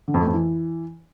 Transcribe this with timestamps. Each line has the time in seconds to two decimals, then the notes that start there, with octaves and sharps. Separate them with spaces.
0.08 D3
0.14 F2
0.21 A3
0.27 F2
0.34 E3